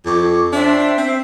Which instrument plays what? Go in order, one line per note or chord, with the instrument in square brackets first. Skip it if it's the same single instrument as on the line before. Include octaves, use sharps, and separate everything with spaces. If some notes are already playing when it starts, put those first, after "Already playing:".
[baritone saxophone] F2 [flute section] C#6 D6
[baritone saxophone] D4 [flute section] C5 E5 G5
[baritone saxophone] C4